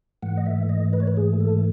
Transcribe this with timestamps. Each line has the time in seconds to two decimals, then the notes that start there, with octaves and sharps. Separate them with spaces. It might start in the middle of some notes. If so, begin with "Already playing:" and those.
0.22 G#2 E3 A3 F#5
0.37 D#5
0.46 E5
0.69 D#5
0.93 B4
1.00 C#5
1.07 B4
1.17 G#4
1.40 A4